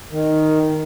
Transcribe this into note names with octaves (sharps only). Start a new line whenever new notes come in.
D#3